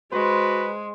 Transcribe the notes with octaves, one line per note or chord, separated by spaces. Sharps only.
G#3 F#4 B4 C5